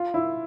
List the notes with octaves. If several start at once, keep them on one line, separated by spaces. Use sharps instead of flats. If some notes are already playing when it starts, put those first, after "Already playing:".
Already playing: F4
E4